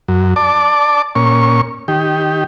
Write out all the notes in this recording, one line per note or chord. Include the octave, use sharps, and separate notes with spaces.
F#2
D5 A5 D6
A#2 C#4 C#6
D#3 G4